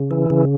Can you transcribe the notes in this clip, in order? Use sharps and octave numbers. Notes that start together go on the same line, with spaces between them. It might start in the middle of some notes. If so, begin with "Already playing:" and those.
Already playing: C#3
E3
C#3